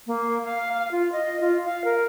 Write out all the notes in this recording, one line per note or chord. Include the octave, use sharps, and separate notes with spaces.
A#3
F5
F5
F4
D#5
F4
F5
A#4